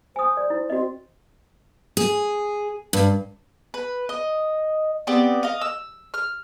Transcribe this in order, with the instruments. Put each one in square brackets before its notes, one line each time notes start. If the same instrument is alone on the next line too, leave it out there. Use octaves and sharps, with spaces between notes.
[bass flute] C5 [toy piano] G#5 D#6
[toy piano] D5
E4
[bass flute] C4 [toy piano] F#4 D#5
[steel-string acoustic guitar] G#4
G2
[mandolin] B4
D#5
B3 C4 G4 D5
D#5 F5
E6
F6